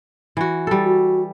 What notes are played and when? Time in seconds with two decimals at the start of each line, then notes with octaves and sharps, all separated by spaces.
0.37 E3 F#4
0.67 G3 A4
0.85 F#4